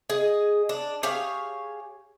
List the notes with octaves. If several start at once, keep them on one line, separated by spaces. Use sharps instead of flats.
G#4 D#5
D4
G4 G#4 C#5 F5